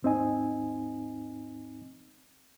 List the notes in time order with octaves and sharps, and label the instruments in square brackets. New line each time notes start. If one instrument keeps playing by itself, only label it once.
[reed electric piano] D#2 G#2 C4 D#4 D#5 G#5